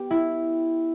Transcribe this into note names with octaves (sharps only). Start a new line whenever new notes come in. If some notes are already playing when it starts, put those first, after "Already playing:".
Already playing: B3 G4
E4